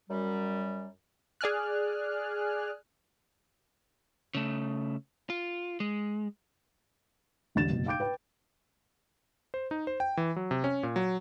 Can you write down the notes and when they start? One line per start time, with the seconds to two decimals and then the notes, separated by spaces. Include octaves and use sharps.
0.10 F#2 G3
1.41 G#4 D5 G#5 F6 F#6
4.35 C#3 A3
5.30 F4
5.80 G#3
7.55 E1 A1 D3 A6 E7
7.70 F#1 B2
7.86 F5 G5 D6 G6 D7
8.00 B4 G5
9.54 C5
9.71 D#4
9.87 C5
10.00 G5
10.17 E3
10.36 F#3
10.51 C3
10.64 C#4
10.83 A#2
10.96 F#3